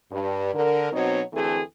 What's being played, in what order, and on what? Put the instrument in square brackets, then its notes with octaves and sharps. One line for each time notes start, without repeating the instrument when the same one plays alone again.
[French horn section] G2
D3 A#4
B2 F#3 C4 D#4 C#5
D2 E3 A3 C4 G#4 A4